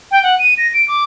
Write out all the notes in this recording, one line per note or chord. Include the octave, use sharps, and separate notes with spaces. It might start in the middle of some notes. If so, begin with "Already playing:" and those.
G5
F#5
D#7
A#6
D7
D6